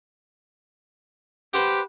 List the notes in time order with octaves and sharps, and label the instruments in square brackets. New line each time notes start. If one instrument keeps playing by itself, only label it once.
[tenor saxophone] G4 [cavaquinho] B4 C5 F#5